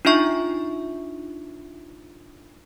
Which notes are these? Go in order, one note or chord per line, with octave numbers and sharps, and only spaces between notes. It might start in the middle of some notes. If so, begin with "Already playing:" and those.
D4 D#4 F4 E5 C#6